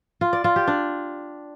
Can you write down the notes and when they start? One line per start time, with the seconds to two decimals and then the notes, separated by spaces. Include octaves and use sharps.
0.21 F4
0.33 D5
0.44 F4
0.56 G4
0.67 D4